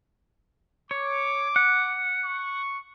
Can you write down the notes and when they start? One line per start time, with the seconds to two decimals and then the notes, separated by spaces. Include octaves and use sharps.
0.91 C#5 D6
1.56 F#5
2.25 C#6